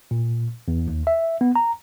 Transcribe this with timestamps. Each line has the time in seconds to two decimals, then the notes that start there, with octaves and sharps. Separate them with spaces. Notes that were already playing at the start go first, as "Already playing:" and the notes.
0.11 A#2
0.68 E2
0.88 D#2
1.07 E5
1.41 B3
1.56 A#5